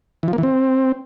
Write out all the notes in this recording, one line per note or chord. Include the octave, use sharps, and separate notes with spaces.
E3
F3
A#3
E3
C4